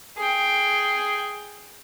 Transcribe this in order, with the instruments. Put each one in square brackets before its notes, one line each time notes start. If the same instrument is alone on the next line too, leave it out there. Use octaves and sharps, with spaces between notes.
[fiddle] G#4 G5